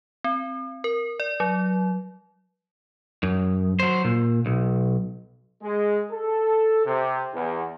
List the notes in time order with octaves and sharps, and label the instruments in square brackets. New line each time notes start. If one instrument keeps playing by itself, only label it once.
[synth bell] C4
A#4
D5
F#3
[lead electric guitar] F#2
F#3 C5
A#2
B1
[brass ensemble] G#3
A4
C3
E2